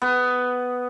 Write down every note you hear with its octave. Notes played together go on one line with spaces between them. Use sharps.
B3